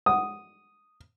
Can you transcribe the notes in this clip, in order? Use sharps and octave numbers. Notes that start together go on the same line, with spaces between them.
D#6